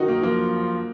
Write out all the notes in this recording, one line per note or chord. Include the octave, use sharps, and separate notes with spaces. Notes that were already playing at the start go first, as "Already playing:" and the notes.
Already playing: D#3 D#4 F#4
A#3
F3 A#3